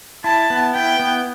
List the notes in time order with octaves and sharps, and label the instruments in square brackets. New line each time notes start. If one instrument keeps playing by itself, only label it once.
[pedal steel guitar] E4 [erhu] A5
[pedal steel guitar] B3
[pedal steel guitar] E4 [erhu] G5
[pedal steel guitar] B3